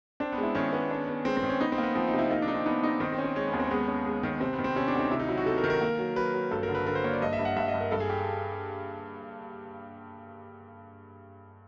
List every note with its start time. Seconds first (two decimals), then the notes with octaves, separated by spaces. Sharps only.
0.20 C4 D4
0.32 B3
0.38 G#3
0.43 E4
0.55 D#3 C#4
0.73 B3
0.90 D4
1.08 B3
1.25 G#3 C4
1.37 C4
1.43 D#3
1.49 C#4
1.60 B3 D#4
1.72 C4
1.78 A#3
1.83 B3
1.95 F3 C4
2.07 D#4
2.14 C3
2.19 E4
2.31 A#3 D#4
2.42 D4
2.48 D#4
2.54 C4
2.66 B3 D#4
2.83 D#4
3.00 D#3 C4
3.12 C4
3.18 C#4
3.24 C4
3.36 G#3 C#4
3.47 B3
3.53 D#2
3.60 C4
3.71 G#3 B3
3.88 C#4
4.06 G#3
4.23 D#3
4.40 C3 C4
4.53 B3
4.58 D#3
4.64 C4
4.76 C3 C#4
4.88 D4
4.94 D2
4.99 D#4
5.11 C3 E4
5.19 D#4
5.28 F#3 E4
5.37 F#4
5.46 C3 A4
5.58 A#4
5.64 D#3
5.70 A#4
5.81 A#3
5.99 F#3
6.16 F#3 B4
6.34 F#3
6.51 G2 A4
6.63 A#4
6.69 D3
6.75 B4
6.86 D3 A#4
6.95 C5
7.04 A#3 C#5
7.13 D5
7.22 G2 D#5
7.33 E5
7.39 G2
7.45 F#5
7.56 G2 E5
7.68 D#5
7.74 G2
7.81 A#4
7.91 G2 A4
8.00 G#4
8.10 G4